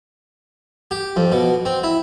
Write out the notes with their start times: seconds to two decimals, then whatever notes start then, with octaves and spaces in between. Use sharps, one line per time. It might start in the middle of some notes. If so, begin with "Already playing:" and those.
0.91 G4
1.16 F2
1.32 B2
1.65 C4
1.84 E4